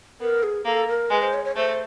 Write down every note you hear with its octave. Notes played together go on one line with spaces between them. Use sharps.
B3 A#4
G#4
A#3 A4
A#4
G#3 B4
C5
C#5
C#5
A3 C5